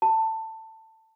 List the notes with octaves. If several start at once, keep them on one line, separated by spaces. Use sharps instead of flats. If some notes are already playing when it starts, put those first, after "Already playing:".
A5